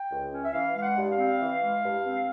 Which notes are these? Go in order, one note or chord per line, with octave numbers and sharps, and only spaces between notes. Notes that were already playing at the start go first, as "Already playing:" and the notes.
Already playing: G5
C#2
C#4
E5
E3 F5
G#3 F5
F#5
G2
F5
C4
E3
G#3
G2
C4